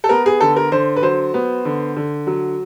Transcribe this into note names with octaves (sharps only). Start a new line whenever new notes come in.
A4
B3 A#4
G#4
D3 A4
A#4
D3 C5
B4
F#3 C5
B3
D3
D3
F#3